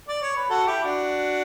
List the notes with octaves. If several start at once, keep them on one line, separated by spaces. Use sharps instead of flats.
D5
C#5
B4
F#4 A4
E4 G4
D4 F#4